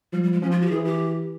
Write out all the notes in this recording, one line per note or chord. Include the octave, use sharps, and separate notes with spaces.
F3 G3
G3
G#3
F3 C#4
F4
F#4
G4
E3 G#4
G4